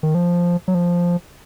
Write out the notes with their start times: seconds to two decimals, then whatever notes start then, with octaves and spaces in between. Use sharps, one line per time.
0.03 D#3
0.15 F3
0.68 F#3
0.75 F3